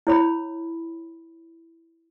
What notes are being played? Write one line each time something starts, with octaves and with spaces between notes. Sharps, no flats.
E4 C#5 B5